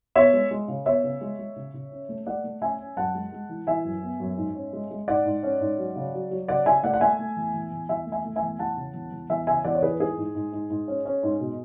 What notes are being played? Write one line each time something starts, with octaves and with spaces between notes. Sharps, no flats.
B3 C#5 E5
G#3
G#3
C#3
B3 C#5 E5
C#3
G#3
G#3
C#3
C#3
C#4
A3
A3 D5 F#5
A3
C#4 E5 G#5
C#4
F#2 F#5 A5
G#3
G#3
E3
E3 E5 G#5
F#2
B3
F#2
G#2
C#4
G#3
G#3
G#2 D5 F#5
G#2
C#4
G#2
F#3
C#3
F#3
F#3
C#3 D5 F#5
C#3 E5 G#5
A3 D5 F#5
F#5
A3 E5 G#5
A3
E2
E2
E2
E2 E5 G#5
A3
E5 G#5
A3
E5 G#5
E2
E2 F#5 A5
C#3
E2
E2
E2 E5 G#5
C#3 E5 G#5
E2 D5 F#5
C#5
E3 G#4 B4
G#2 G#4
G#2
G#2
G#2
G#2
C#4
C#4
G#2
B2